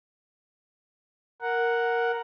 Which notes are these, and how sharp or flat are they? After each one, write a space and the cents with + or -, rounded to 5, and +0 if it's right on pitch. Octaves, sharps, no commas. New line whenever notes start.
A#4 +0 F#5 +0